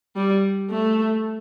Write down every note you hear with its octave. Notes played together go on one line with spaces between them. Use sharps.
G3
A3